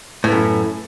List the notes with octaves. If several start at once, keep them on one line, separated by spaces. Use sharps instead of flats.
F#2 A2 B3